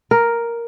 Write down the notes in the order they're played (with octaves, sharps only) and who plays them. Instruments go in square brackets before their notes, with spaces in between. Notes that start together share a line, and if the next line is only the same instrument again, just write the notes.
[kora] A#4